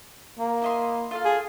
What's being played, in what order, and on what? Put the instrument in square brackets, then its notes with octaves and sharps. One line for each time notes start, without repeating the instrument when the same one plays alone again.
[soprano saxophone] A#3
[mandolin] E4 D#5 C6
F4 A4 F5
[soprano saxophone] G#4